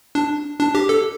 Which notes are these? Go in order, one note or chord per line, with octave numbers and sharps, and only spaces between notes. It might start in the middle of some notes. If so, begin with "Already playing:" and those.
D4
D4
G4
A4